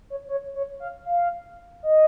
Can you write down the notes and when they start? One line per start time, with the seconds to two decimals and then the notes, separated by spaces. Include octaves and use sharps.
0.10 C#5
0.29 C#5
0.55 C#5
0.80 F5
1.05 F5
1.83 D#5